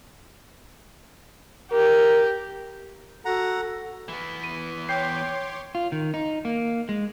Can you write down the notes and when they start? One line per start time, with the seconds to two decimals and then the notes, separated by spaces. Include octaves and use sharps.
1.72 G4 A#4
3.25 F#4 A4 F#5 A#5
4.08 E3 B3
4.44 D#7
4.89 C#5 G5 C6 D6 G6 C7
5.75 F4
5.92 D#3
6.14 D#4
6.45 A#3
6.89 G#3